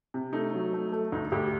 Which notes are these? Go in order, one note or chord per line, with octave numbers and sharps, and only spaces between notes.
C3
A3 D#4
F#3
A3
A3
D2 D#4
D2 G4